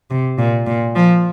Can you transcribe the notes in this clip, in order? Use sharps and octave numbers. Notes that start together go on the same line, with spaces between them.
C3
A#2
A#2
F3